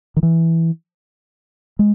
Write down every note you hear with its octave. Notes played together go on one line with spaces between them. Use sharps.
D#3
E3
G#3